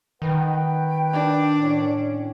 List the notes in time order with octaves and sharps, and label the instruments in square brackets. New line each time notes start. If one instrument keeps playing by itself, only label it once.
[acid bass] D#3 [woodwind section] B4 F#5 G5
[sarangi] D4
[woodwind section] A2 C#4